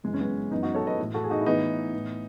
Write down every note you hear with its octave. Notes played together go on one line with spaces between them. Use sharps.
F#2 C#3 E3 G#3
C#4
G#3 B3
F#2 E3 B3 D#4
D#4 F#4
A4 C#5
B4 D#5
A2 E3
F#4 A4
G#4
D#4 F#4
E4
A2 E3 B3 D#4
A2 E3